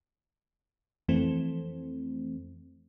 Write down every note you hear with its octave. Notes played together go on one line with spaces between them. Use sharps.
F2 E3 A3 C4